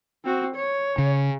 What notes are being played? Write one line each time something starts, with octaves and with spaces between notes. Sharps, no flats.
C4 F#4
C#5
C#3